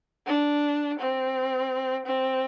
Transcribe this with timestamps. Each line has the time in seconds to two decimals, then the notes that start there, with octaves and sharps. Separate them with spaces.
0.27 D4
0.99 C4
2.06 C4